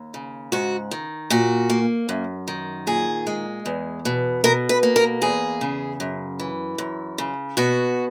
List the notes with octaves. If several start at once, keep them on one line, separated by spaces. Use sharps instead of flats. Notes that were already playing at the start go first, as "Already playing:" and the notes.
Already playing: D#2
C#3
G#2 F#4
D#3
A#2 F#4
A#3
F#2
D#3
A#2 G#4
G#3
E2
B2
B2 A#4
B4
A#3
A#4
E2 G#4
C#3
F#2
E3
F#2
C#3
B2 F#4